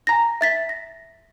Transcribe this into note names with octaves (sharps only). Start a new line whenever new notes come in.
G#5 A#5 A#6
E5 A6 B6
A#6